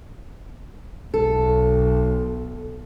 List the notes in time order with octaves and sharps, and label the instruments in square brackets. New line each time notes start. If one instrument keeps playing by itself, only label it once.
[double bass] B1 [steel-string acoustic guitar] A4